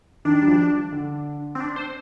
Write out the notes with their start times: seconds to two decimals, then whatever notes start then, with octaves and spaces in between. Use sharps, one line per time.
0.25 D#3 D4
0.42 G3
0.48 F3
0.92 D3
1.55 C4
1.60 D4
1.76 C5